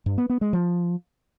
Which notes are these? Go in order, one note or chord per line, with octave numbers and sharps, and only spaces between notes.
G2
B3
B3
G#3
F3